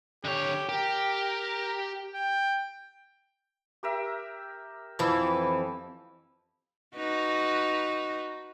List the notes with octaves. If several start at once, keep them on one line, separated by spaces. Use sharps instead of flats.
D3 G4 C#5
G4 A#4
G5
G4 A#4 E5
F2 E3 F3 B5 E6
D#4 F#4 B4